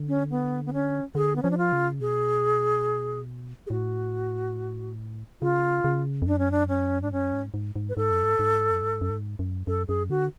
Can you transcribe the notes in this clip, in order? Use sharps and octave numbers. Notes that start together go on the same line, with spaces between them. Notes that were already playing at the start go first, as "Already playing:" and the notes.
Already playing: D3
C#4
B3
B3
C#4
D3 G#4
B3
F3 C#4
D4
F4
C#3
B2 G#4
G#4
A2 F#4
C#3 F4
C#3
F2
F#2 D4
C#4
D4
C#4
G#2 D4
F#2 C#4
G#2
G#2
G#2
B4
G#2 A4
F#2
G#2
G#2
F#2
G#2
F#2
G#2
F#2
F#2 A4
F#2 G#4
D3 F#4